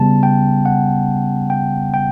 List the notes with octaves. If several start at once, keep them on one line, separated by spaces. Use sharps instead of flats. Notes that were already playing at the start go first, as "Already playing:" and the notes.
Already playing: C#3 G3 B3 A5
G5
F#5
G5
G5